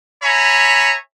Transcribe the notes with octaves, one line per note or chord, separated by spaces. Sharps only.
C#5 E5 G#5 A#5 B5